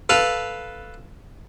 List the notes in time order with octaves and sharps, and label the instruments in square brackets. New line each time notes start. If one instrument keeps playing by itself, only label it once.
[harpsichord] A4 B4 F5